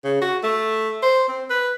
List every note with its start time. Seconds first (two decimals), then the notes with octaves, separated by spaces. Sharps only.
0.04 C#3
0.21 F#4
0.43 A3
1.02 C5
1.28 C4
1.50 B4